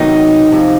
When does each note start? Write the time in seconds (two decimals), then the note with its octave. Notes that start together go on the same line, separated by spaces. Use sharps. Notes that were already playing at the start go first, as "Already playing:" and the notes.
Already playing: C3 D#3 F#3 B3 D#4
0.52 F2 C3 F3